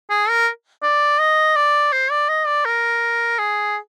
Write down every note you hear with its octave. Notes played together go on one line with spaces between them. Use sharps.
G#4
A#4
D5
D#5
D5
C5
D5
D#5
D5
A#4
G#4